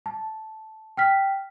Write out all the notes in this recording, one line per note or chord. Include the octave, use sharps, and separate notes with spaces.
A5
G5 F6 B6